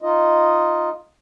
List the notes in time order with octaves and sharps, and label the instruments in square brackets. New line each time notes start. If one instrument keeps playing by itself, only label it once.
[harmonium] D#4 F4 D#5